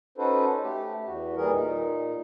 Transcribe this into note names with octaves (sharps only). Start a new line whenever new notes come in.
C#4 D#4 F#4 A4 B4 C5
A3 G4
E2 F#4
D#2 E3 G3 G#4 A#4
A#2 D#4